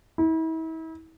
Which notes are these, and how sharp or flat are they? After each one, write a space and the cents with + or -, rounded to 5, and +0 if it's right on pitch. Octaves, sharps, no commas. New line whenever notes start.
E4 -40